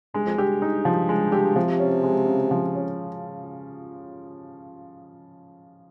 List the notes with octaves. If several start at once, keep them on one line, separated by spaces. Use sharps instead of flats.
G2 G#3
F2
G2 G4
D#4
F3
G#3
G4
C3 F3
C#4
G#3
C#3
F3
C#4